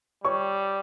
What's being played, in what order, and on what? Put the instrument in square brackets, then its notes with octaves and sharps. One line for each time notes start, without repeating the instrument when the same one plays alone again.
[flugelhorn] G3 [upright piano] C#5 C#6